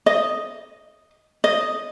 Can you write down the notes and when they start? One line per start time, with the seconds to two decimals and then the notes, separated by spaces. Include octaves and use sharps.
0.06 D#5
1.44 D#5